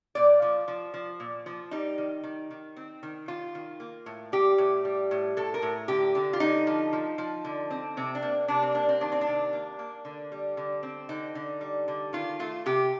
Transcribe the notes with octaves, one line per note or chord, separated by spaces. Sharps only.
A#2 D5
F3
F3
F3
A#2
F3
G3 D#4
D#3
D#3
D#3
C4
D#3
D#3 F4
D#3
A#3
A2
G3 G4
A2
G3
A2
A2 A4
A#4
A2
D3 G4
D3
F4
D3 D#4
F3
F3
F3
D3
C4
C3 C4
D4
A#3
C3 D4
C4
A#3 D4
C4
D#3 D4
C4
D4
C3
A#3
A#3
D3
G3
D3
C4
D3 D#4
D3
G3
D3
D#3 F4
A3 F4
C3 G4